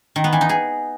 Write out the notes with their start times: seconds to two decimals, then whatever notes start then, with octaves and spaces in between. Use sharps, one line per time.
0.16 D#3
0.24 B3
0.33 E3
0.41 D#4
0.49 G#4